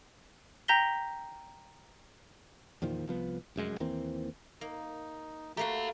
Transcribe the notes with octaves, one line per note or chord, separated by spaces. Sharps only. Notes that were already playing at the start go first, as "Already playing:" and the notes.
G5 A#5 G6 A#6 B6 G7
E2 A#2 D#3 F3
C2 F3 B3
F1 F#2 G#3
D#2 E3 A#3 C4
A#3 D#4
A3 A#3 F#4 G4 F5 A#5